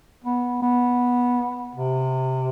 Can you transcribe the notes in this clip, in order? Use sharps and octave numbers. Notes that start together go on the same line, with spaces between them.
B3
B3
C3